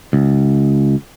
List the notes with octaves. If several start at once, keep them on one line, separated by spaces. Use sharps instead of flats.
C#2